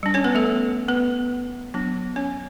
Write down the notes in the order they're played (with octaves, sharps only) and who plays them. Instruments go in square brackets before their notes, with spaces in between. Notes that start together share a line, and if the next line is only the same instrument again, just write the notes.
[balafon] G3 D4
C#4 C#5
B3 B4
A3 A4
B3 B4
F#3 B3 D4
C#4 C#5